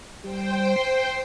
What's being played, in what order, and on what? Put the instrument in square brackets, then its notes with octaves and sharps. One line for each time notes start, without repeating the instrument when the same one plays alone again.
[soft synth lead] G3 [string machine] C5 G5
[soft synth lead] C7